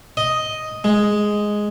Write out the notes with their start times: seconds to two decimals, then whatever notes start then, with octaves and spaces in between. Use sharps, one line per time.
0.17 D#5
0.84 G#3